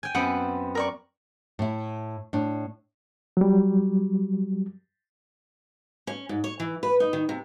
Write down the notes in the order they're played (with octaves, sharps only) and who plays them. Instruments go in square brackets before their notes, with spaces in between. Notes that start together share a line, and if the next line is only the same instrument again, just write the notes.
[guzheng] G5 G#5
[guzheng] F#2 B3 C4 [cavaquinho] F#5
[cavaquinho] A#4 D5 C#6
[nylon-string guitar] A2 E4
A2 D4
[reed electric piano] F#3 G3
[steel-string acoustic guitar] C#4
G#2
C#5
E3
B4
D#4
D#3
C3